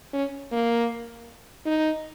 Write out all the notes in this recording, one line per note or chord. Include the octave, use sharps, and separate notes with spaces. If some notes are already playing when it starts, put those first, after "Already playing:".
C#4
A#3
D#4